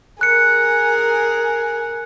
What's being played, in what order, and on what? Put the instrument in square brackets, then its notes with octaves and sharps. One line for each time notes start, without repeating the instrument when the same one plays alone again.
[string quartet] G#4 A#4 [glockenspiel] F#6 C#7